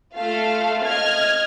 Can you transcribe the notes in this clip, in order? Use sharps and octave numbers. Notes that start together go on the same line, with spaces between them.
A3 F4 F5
D#5 F6 G#6